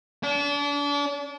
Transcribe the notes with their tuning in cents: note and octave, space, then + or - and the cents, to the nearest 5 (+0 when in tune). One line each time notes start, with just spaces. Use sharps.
D4 -35